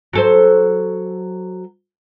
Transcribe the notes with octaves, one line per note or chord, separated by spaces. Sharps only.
F#3 A4 C5